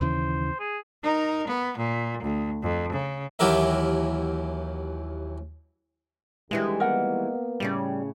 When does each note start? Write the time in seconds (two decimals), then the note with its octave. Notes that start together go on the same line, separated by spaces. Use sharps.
0.01 D#2 C#3 E3 C5
0.60 G#4
1.03 D#4 A#4
1.47 B3
1.77 A#2
2.23 D2
2.63 F2
2.92 C#3
3.39 D#2 E3 F#3 G4 A#4 E5
6.51 D2 D#3 E3 G3 G#3 D4 G4
6.80 A#3 B3 A#4 F#5
7.60 A2 C#3 G3 C#4